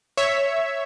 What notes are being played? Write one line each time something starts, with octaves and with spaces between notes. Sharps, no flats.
C#5 E5